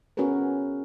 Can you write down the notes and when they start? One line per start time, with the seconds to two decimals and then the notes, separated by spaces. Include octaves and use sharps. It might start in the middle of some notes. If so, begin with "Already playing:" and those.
0.17 B3 C#4 F#4 G#4 A#4 B4